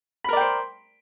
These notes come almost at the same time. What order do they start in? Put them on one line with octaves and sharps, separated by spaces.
B5 A#4 D5 G5 C5